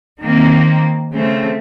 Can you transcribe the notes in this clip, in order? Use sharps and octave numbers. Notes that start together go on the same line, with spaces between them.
D#3 A#3 C4
C#3 A3 C4